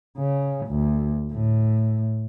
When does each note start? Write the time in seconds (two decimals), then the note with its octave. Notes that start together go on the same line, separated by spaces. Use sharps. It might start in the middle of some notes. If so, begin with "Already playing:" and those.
0.18 C#3
0.67 D2
1.32 A2